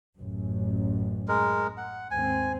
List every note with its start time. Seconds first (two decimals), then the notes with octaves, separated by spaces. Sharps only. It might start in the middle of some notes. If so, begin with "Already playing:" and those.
0.16 A1 F#2
1.28 G#3 A#4
1.77 F#5
2.11 D#2 G#2 C4 G#5